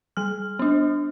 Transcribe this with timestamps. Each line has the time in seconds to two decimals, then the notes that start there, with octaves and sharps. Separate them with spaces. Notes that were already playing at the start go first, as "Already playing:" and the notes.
0.17 G3 F6
0.59 B3 D4